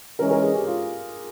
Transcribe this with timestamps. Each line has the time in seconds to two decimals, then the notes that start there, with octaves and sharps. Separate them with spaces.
0.19 E3 G#3 C#4 A#4
0.31 A#4
0.43 G#4
0.55 G4
0.67 F4